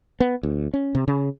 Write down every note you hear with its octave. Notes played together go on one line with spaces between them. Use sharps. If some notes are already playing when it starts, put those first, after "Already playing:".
B3
D2
C#4
C3
C#3